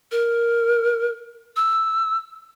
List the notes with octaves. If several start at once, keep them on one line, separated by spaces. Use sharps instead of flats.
A#4
E6